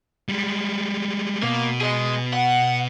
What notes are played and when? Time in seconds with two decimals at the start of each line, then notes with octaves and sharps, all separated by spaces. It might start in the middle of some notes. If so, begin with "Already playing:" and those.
0.29 G3 G#3
1.43 B2 A#3
1.81 G#4 D#5
2.33 F#5